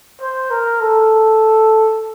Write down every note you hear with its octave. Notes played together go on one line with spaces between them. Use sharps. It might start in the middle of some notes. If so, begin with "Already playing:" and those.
C5
A#4
A4